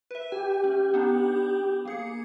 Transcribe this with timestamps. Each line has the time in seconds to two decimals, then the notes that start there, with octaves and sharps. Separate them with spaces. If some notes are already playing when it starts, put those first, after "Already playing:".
0.11 B4 E5
0.32 G4 G#5
0.64 C#4
0.94 B3 D4 D#4
1.85 A#3 G#4 C#7